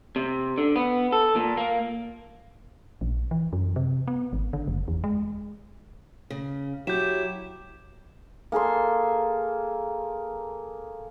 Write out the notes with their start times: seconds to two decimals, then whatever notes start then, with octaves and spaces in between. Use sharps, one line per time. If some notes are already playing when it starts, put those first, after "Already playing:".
0.16 C3
0.58 D3
0.76 B3
1.12 A4
1.36 A#2
1.57 A#3
3.01 A#1
3.31 E3
3.53 F#2
3.76 C3
4.08 B3
4.33 G#1
4.53 D3
4.68 F#1
4.88 E2
5.04 G#3
6.30 C#3
6.87 F#3 E4 G4 G6 E7
8.52 A#3 G#4 A4 C6